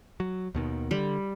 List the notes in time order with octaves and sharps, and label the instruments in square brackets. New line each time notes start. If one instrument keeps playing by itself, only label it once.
[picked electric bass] F#3
D#2 B2 D#3
[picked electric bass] D3 [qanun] G3